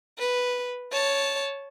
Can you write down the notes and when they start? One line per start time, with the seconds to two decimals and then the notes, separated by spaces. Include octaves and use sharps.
0.19 B4
0.92 C#5 A5